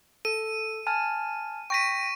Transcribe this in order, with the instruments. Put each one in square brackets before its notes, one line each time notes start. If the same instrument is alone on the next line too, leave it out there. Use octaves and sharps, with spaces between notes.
[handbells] A4 [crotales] D#7
[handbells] G#5 A5 F6
[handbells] G5 A#6 B6 [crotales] C#6 D#7